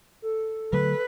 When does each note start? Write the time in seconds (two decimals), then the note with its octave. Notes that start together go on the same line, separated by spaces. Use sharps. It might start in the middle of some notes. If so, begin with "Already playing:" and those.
0.22 A4
0.73 D3 F#3 A3 B4